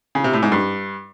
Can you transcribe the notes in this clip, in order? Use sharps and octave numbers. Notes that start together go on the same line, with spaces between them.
C#3
C3
A2
G#2
G2